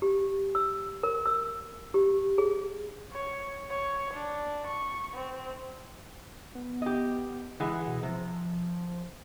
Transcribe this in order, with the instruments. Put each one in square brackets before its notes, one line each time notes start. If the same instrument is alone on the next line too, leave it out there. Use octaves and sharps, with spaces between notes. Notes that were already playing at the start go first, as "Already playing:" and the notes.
[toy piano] G4
E6
A#4
E6
G4
G#4
[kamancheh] C#5
C#5
D4
C#6
C4
[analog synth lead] B3
[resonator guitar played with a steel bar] G4 D#5
[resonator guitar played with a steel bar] E3 G#3 [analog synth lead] F#5
[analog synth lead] B2
[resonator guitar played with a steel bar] C3 [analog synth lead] F3